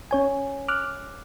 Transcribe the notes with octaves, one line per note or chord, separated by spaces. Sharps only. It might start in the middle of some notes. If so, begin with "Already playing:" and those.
C#4 C#5 G#5
D6 F6 F#6